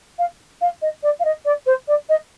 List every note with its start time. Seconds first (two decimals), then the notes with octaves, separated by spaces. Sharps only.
0.18 F5
0.61 F5
0.81 D#5
1.03 D5
1.19 F5
1.24 D#5
1.45 D5
1.66 C5
1.87 D5
2.09 D#5